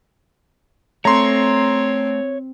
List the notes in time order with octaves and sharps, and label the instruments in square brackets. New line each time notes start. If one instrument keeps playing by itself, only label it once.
[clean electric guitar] A3 [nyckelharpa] C4 [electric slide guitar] C#5 [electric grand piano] A#5 C6